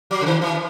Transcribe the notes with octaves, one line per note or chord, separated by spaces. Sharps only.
F#3
C#3
D#3
E3